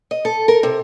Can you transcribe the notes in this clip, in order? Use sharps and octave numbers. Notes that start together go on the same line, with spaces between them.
D#5
A4
A#4
C3